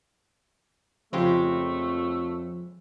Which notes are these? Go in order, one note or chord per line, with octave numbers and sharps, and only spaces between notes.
F2 C#3 F3 G#3 A3 G4